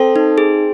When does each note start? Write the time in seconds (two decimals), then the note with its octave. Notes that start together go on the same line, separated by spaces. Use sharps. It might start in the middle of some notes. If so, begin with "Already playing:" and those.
Already playing: C4 A4
0.16 D#4
0.38 G#4